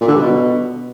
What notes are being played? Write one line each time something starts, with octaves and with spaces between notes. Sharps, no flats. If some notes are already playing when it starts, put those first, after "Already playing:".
A#2
D3
G2
B2